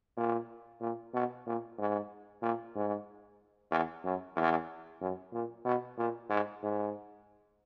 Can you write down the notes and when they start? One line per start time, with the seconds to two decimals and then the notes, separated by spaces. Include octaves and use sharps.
0.17 A#2
0.81 A#2
1.14 B2
1.46 A#2
1.78 G#2
2.42 A#2
2.75 G#2
3.71 E2
4.04 F#2
4.36 E2
5.01 F#2
5.32 A#2
5.65 B2
5.97 A#2
6.29 G#2
6.63 G#2